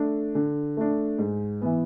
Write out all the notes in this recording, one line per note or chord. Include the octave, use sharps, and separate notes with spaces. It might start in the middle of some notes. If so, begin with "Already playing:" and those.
Already playing: A3 D4
D3
A3 D4
G#2
E3 B3